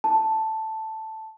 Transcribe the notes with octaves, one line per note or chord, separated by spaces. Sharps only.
A5